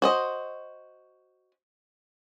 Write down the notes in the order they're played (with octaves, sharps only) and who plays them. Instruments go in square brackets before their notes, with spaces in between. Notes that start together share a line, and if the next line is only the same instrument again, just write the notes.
[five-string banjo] F#4 C5 D#5